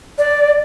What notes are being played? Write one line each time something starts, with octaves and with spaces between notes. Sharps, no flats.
D5